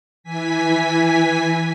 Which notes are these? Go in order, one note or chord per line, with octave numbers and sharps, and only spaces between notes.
E3 G#5 B6